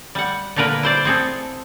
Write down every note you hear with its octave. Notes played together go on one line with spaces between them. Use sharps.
G3 F#5
A#2 D3 A#3 A#4 B4
E4 C5 D5
C4 G#4 A4